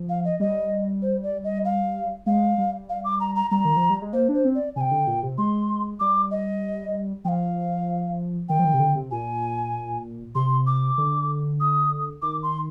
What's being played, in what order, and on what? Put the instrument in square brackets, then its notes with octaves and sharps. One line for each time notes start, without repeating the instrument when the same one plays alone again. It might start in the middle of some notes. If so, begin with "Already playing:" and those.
Already playing: [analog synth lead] F3
[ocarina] F5
D#5
[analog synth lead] G3 [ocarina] D#5
[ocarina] C5
D5
D#5
F5
[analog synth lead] G#3 [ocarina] F5
[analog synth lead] G3
[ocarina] F5
D6
A#5
A#5
[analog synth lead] G3 [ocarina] A#5
[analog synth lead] D#3
F3
G3
G#3
[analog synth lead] A#3 [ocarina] C5
[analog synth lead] D4
[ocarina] C5
[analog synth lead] C4
[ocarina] D5
[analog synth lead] C3 [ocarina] G5 G#5
[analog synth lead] D3
A#2
C3
[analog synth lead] G#3 [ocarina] C6
[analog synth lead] G3 [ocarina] D6
[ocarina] D#5
[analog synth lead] F3 [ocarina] G5
[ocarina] F5
[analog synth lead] D#3 [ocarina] G5
[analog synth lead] F3
D#3
C3
D3
C3
[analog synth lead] A#2 [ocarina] G#5
[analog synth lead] C3 [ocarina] C6
[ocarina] D6
[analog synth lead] D3
[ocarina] D#6
[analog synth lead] D#3 [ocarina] D6
[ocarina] C6